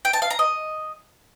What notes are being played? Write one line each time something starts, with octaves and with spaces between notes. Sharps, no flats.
G5
A5
F5
A#5
D#5